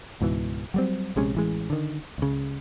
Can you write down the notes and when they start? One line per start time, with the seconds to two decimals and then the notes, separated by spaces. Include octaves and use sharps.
0.21 C#2 G#2 B2 E3
0.74 F#3 G3 C4
1.16 A#1 C3 G#3 C#4
1.35 A1 E3 G#3
1.70 D3 D#3
2.18 C#2 C#3